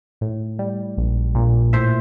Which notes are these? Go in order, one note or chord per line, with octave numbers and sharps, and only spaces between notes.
A2
G3
A#1
A#2
A2 C5 E5